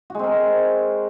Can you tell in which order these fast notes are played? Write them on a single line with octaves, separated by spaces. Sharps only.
F#4 G#3 C4 A#4